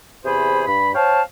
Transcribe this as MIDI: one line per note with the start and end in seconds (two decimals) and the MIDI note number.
0.25 0.66 40
0.25 0.66 48
0.25 0.66 68
0.25 0.66 72
0.25 0.66 83
0.67 0.92 43
0.67 0.92 83
0.94 1.21 72
0.94 1.21 73
0.94 1.21 77
0.94 1.21 79
0.94 1.21 81